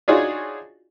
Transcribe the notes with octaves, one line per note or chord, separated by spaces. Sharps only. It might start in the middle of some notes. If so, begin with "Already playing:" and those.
D4 D#4 F4 F#4 G#4 C#5